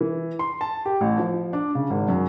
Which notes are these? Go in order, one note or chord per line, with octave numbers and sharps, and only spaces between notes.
E3
C6
A5
G4
A1
F3
D4
C#3
G#1
F#2